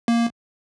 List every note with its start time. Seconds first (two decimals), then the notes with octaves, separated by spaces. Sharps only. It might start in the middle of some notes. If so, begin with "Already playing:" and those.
0.08 A#3